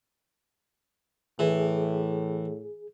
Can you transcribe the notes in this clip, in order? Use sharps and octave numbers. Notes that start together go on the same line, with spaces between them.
A2 E3 G#4